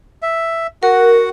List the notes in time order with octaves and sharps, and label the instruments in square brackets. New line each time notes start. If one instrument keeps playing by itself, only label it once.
[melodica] E5
[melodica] F#4 F#5 [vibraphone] A#4